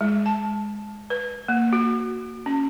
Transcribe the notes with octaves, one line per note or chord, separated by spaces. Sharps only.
G#3
A5
B4
A#3
F#4
C#4